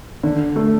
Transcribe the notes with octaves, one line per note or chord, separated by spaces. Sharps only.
D3
A3